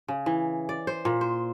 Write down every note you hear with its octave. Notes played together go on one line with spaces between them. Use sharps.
C#3
E3
D5
C5
A#2
C5